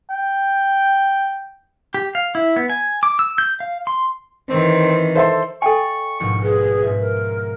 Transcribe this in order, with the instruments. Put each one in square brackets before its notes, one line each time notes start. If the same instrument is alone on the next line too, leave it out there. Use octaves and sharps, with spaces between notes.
[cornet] G5
[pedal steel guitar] G4
F5
E4
B3
G#5
D6
E6
G6
F5
C6
[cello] D#3 E3 [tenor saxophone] C4
[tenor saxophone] A4 [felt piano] C5 E5 C6
[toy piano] A4 G5 G#5 [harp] D5 F5 [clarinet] C#6
[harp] A#1 G#2 B2 [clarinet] C#6
[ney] G#4 [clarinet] B4
[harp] G#2 E5
[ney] A#4